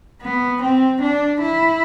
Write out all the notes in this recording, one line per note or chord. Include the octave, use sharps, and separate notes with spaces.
B3
C4
D4
E4